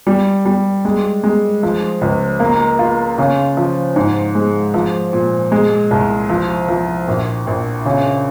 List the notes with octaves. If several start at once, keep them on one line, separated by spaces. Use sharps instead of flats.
G3
G3
G#3
G#3
F3
C#2
A#3
F4
C#3
F3
G#2
G#3
F3
A#2
G#3
C2
F3
F3
A#1
A#1
C#3